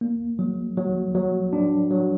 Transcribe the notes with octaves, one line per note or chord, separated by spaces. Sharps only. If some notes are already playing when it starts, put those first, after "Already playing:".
A#3
F#3
F#3
F#3
D4
F#3